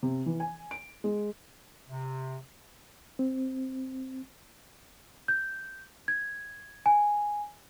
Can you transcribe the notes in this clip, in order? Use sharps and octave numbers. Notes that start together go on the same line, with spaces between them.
C3
E3
G#5
D7
G#3
C3
C4
G6
G#6
G#5